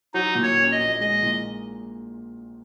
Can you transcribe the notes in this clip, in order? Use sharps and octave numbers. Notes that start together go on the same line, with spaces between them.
F#3 D#4
A#2
C#5
C#4
D#5
A#1
G#3 D#5
A#2